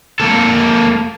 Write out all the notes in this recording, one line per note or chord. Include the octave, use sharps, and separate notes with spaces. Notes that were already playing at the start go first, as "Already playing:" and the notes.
A#3 A4